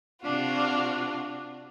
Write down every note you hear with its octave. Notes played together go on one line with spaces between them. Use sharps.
C3 D4 F4 F#4